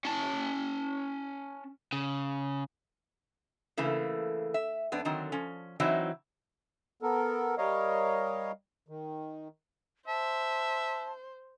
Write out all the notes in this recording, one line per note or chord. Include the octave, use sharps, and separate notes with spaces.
C#4 A5
C#3
C#3 E3 A3 A#3
E5
F2 B3 D4
D3 D#3 F#3 C4
F3 C#4
E3 F#3 C4 D#4 E4
B3 A4 A#4
G3 A#4 C#5 D#5 F5
D#3
C5 E5 A5